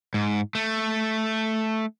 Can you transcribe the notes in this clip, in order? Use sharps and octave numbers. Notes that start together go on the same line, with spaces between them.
G#2
A3